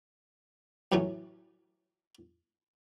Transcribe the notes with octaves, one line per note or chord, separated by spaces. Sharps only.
F#2 A2 E3 F#3 C#4